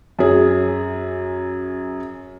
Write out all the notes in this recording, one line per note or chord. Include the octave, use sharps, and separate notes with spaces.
F#2 G#4